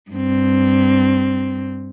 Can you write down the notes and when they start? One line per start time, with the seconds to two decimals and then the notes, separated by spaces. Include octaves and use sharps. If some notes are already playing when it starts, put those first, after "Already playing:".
0.11 G2 C4